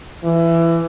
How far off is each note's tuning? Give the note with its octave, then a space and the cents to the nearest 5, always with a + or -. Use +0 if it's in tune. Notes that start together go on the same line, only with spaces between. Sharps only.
E3 +20